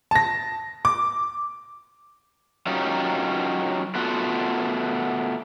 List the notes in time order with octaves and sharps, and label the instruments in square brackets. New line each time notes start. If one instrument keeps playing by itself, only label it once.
[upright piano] A5 A#6
D6
[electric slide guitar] F#3 C#4 D#4 F4 G4
A3 B3 F4 F#4